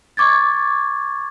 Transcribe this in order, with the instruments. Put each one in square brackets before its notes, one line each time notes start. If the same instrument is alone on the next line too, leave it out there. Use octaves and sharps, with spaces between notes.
[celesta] C#6 D6 G#6 A6